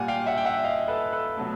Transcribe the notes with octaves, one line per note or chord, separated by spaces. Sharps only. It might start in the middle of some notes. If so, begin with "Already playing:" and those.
Already playing: A#2 G3 F#5 G#5
F5 G5
E5 F#5
G5
E5 F#5
D#5 F5
A4 B4
A4 B4
B2 F#3 A3